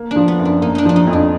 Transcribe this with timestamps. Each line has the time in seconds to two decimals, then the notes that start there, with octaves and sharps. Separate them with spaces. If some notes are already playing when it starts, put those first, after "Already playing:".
Already playing: A#3
0.11 F3 D4
0.28 B3
0.39 F#2
0.45 D4
0.61 A#3 D#4
0.75 D4 D#4
0.85 F3 D4
0.96 D#4
1.07 F2
1.13 D4